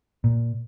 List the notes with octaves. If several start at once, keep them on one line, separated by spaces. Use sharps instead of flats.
A#2